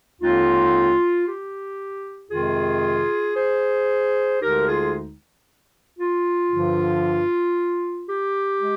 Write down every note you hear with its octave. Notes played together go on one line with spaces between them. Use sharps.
D#2 D3 G#3 C4 D#4 F4
G4
F2 C3 D#3 G#3 F4 G#4
G#4 C5
D2 D3 G#3 D#4 G4 A#4
F4 G#4
F4
G2 D3 F3
G4
G#3